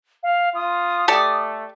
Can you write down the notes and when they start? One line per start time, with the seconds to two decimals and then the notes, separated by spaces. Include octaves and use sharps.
0.23 F5
0.55 F4 D#6
1.08 A3 G4 A4 D5